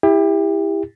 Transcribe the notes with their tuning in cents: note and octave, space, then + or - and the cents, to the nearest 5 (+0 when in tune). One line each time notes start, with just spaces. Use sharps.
E4 +0 G4 +30